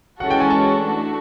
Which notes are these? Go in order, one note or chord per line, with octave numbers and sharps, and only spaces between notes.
E3 G#3 C#4 F#4 A4 F#5
G5
G#5
A5
A3 D4 F#4